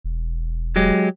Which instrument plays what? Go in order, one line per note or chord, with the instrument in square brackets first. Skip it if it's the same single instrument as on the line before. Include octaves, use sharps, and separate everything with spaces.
[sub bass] E1
[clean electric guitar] F#3 G#3 G4